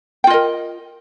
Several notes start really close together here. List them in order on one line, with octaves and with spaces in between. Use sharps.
G5 F4 D#5 A#4